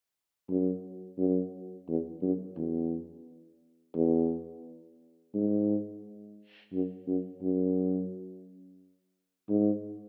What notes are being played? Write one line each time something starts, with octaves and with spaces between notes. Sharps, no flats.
F#2
F#2
E2
F#2
E2
E2
G#2
F#2
F#2
F#2
G#2